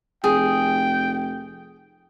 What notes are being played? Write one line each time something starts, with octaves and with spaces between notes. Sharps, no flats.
F1 G#4 G5